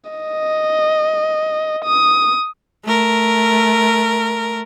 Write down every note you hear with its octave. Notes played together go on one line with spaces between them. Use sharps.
D#5
D#6
A3 A#4